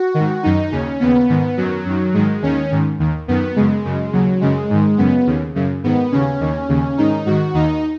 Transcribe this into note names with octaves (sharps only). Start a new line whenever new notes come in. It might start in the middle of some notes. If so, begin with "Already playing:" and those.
Already playing: F#4
D#3
G#2
F#2 D#3 D#4
D#2 C#3 C#4
D#2 C#3 B3
G#2 D#3
F#2 D#3 F#3
F#2 D#3
G#2 D#3 G#3
D#2 D#3 C#4
G#2 D#3
D#2 D#3
F#2 D#3 B3
F#2 C#3 G#3
F#2 C#3
D#2 C#3 F#3
F#2 C#3 G#3
G#2 D#3
F#2 C#3 B3
D#2 C#3
F#2 C#3
G#2 D#3 B3
D#2 C#3 C#4
D#2 D#3
D#2 C#3
G#2 D#3 D#4
G#2 D#3 F#4
D#2 D#3 D#4